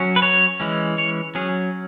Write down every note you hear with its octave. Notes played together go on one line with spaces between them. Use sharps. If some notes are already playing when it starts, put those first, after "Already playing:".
Already playing: F#3 C#4
B4
C#5
E3 G#3 C#4
C#5
F#3 C#4 G#4